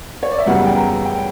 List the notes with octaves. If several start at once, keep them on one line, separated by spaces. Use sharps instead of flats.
C#5
D5
E5
F#2 C#3 E3 G3 B3 F#5
G5
A#5
G5